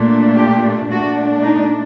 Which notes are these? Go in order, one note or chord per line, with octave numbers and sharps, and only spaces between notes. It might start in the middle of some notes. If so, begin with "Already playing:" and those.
Already playing: A#2 A3 D4
G4
A#2 A3 D4 F#4
D#4